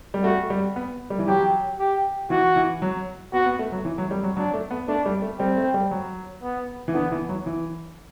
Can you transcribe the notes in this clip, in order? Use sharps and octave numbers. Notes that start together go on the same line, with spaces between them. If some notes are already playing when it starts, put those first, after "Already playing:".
G3
A3 F#4
G3
B3
G3
E3
F#3 G4
G4
E3 F#4
E3
F#3
B3 F#4
B3
A3
F#3
E3
F#3
G3
F#3
F#3 D4
A3
B3
A3 D4
G3
A3
G3 C4
A3
G3
F#3
B3
E3
D3 B3
E3
F#3
E3